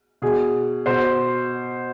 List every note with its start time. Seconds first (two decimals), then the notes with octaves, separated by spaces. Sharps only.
0.22 B2 G#4
0.86 B2 C5